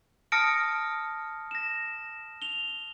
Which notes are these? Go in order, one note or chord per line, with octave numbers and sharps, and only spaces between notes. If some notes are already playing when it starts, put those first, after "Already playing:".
A5 D#6 F6 A#6 C#7 D7
A#6 E7
F7 G7